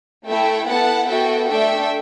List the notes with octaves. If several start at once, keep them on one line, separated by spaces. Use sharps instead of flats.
A3 E4 A4 E5 G5
B3 E4 A4 F#5 A5
B3 F#4 A4 E5 G5
A3 D4 A4 E5 G5